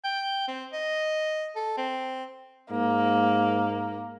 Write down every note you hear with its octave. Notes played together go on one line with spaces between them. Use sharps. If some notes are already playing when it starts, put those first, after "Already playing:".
G5
C4
D#5
A4
C4
G#2 A#3